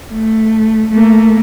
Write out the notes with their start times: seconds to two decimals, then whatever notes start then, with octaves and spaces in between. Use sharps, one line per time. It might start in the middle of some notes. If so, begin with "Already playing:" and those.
0.12 A3
0.91 A3 A#3